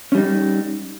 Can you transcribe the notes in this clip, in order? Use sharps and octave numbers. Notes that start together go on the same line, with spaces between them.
G3 C#4 D#4